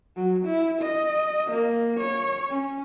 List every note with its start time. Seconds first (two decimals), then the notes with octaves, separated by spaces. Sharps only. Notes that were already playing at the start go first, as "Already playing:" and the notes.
0.16 F#3
0.46 E4
0.82 D#5
1.51 A#3
2.00 C#5
2.50 C#4